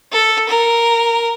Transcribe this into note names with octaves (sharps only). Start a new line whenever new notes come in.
A4
A#4